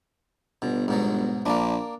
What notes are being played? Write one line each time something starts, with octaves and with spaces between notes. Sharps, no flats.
G1 B2
G#2 B2 F#3
A#1 A#3 D4